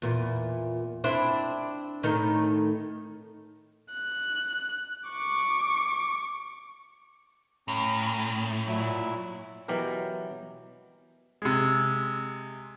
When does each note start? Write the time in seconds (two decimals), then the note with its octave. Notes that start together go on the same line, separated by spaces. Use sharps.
0.02 E2 A#2
1.04 C4 D4 E4
2.03 A2 D#3 D#4
3.93 F#6
5.09 C#6 D6
7.68 A2 C#4 A#5
8.67 A#2 F#3 E4
9.68 B2 E3 F#3 G4 A#4
11.42 C3 G#3